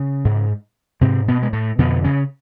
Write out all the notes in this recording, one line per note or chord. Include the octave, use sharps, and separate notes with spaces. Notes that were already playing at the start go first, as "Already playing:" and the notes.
Already playing: C#3 C#4
G#2
G#2 C3 C4
B2 B3
G#3
A2 A3
F2 B2 D3 B3
C#3 C#4